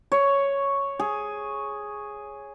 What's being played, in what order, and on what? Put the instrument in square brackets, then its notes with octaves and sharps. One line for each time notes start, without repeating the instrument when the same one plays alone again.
[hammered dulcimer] C#5
G#4